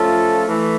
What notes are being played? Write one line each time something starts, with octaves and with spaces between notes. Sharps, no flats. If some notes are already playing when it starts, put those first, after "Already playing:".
Already playing: F3 A3 C#4 F4 A4
E3 A3